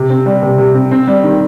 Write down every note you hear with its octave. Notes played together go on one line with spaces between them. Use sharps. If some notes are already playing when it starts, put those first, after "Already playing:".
Already playing: C3
C4
G3
C3
C3
C4
C4
G3
D#3